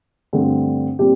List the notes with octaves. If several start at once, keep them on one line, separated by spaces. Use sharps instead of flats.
G2 D3 A3 C4
A#2 G3 C4 G4